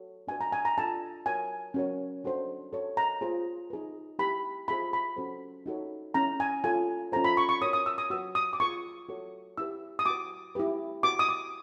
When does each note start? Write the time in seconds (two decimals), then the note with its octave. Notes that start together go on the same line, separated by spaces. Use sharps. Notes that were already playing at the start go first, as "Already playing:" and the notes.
Already playing: F#4 A4 C#5
0.28 D4 F#4 B4 G#5
0.41 A#5
0.52 G#5
0.65 A#5
0.78 D4 F4 A4 A5
1.26 F#4 A#4 C#5 G#5
1.74 C#4 F#4 A#4 C#5
2.24 D4 F#4 A4 C5
2.73 F#4 A4 C#5
2.97 A#5
3.21 F4 G#4 C5
3.70 D#4 G#4 B4
4.19 E4 G4 B4 B5
4.68 F4 G#4 C5 B5
4.93 B5
5.17 C#4 F#4 A4 C5
5.66 D#4 F#4 A4 C#5
6.14 C#4 E4 G#4 A#5
6.40 G#5
6.64 F4 A4 C#5 G#5
7.12 C#4 F4 A4 C5 A#5
7.24 B5
7.37 C#6
7.49 C#6
7.62 F#4 A#4 C#5 D#6
7.73 D#6
7.86 E6
7.98 D#6
8.10 F#4 B4 E6
8.35 D#6
8.53 D6
8.60 F4 G#4 B4 C#6
9.09 F#4 A4 C#5
9.58 E4 G4 B4 E6
9.99 D#6
10.06 F#4 B4 D6
10.55 E4 G4 B4
11.03 F#4 B4 D6
11.19 D#6
11.29 D6